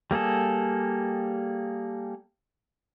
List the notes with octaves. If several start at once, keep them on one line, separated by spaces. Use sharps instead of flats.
G3 A#3 G#4 A4